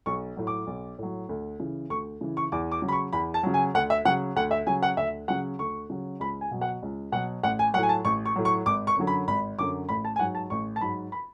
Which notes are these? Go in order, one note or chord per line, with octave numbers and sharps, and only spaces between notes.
B1 C#6
A2 F#3
D6
B1
A2 F#3
D2
C#3 E3
D2 C#6
C#3 E3
C#6
E2 D6
D6
C#3 F#3
B5
C#6
E2 B5
A5
C#3 F#3
G#5
D2 F#5
E5
C#3 F#3 F#5
D2 F#5
E5
C#3 F#3 G#5
F#5
D2 E5
C#3 F#3 F#5
D2 C#6
C#3 F#3
C#2 B5
G#5
B2 F#3
F#5
C#2
B2 F#3 F#5
A1 F#5
G#5
A2 F#3 F#5
G#5
A5
A1 C#6
C#6
A2 F#3
C#6
G#1 D6
C#6
F#2 D3 F#3
B5
G#1 B5
F#2 D3 F#3 D6
A1 B5
A5
G#5
G#2 F#3 F#5
A5
A1 C#6
A5
G#2 F#3 B5
B5